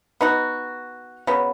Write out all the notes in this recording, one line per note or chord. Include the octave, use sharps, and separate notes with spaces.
B3 D#4 F#4
C#3 F#3 B3